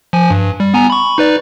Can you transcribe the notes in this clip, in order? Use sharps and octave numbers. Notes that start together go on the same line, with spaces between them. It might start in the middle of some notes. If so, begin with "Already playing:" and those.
F3 G#5
G2
G3
B3 G#5 A#5
B5 C#6
D#4 B4 D5